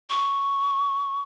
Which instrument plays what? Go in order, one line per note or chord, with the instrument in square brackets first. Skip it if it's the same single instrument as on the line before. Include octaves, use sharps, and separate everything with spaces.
[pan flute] C#6